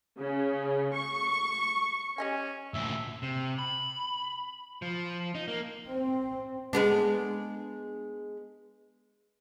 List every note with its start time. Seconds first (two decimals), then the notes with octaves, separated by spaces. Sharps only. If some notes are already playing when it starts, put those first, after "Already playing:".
0.18 C#3
0.94 C#6
2.18 C#4 G4 D#5 G#5
2.74 D2 A#2 E5
3.23 C3
3.59 B5
4.82 F3
5.35 D#4
5.48 A#3
5.91 C4
6.73 G#3 B3 D4